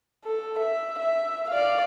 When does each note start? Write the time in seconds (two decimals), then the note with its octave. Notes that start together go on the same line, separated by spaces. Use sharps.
0.25 A4
0.59 E5
0.99 E5
1.50 D5 F5